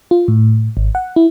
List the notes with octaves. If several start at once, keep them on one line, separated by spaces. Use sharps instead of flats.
F4
A2
G#1
F#5
E4